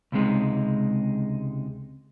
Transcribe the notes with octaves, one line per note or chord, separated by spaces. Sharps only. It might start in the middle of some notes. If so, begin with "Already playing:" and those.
C#2 C3 G#3 D#4